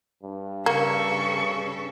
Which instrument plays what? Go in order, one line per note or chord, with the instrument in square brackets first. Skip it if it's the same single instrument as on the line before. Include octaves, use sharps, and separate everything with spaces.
[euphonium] G2
[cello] C#3 A4 [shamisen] A#3 [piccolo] C#6